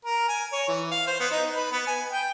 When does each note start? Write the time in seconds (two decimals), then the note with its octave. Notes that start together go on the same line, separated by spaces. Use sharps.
0.05 A#4
0.29 G#5
0.52 C#5
0.68 E3
0.91 F5
1.07 C5
1.20 B3
1.31 D#4
1.55 B4
1.72 B3
1.87 G#5
2.12 G5